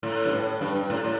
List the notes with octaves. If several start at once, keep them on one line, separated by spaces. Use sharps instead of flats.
A2
G2
A2
G2
G2
A2
A2